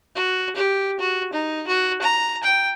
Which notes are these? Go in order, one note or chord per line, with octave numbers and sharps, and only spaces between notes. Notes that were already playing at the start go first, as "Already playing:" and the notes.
F#4
G4
F#4
D#4
F#4
A#5
G5